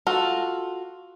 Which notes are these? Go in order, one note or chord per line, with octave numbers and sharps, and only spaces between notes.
F4 F#4 A4